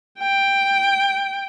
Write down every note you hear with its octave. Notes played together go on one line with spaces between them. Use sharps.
G5